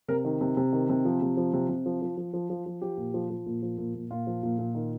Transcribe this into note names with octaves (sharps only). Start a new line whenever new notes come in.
C3 A#4
D#3
C3
C3
D#3
C3
F3
C3
F3
C3
C3
F3
F3
F3
F3
F3
F3
F3 G4
A#2
F3
F3
A#2
F3
A#2
A#2
A#2 F4
F3
A#2
A#2
D#3